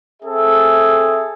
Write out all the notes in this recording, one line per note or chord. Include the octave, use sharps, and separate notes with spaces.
C4 G#4 A4 E5